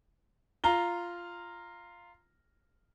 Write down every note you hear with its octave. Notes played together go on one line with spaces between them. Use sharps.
F4 A#5 G7